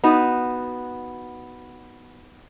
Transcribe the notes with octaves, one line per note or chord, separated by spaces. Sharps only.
B3 D#4 F#4